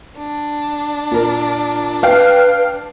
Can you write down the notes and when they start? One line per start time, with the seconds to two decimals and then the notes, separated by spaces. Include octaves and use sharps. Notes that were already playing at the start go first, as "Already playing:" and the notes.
0.17 D4
1.11 A#2 A#4
2.03 B4 F5 G5